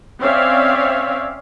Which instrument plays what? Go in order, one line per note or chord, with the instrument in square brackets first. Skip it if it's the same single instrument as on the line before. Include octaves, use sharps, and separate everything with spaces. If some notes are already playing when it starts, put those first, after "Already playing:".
[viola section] C4 C#4 C#5 D5 E5 F5